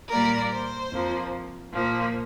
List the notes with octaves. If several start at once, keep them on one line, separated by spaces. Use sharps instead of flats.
A#2 G3 A#3 A#4 D5
C5
F2 F3 A#3
A#2 F3 A#3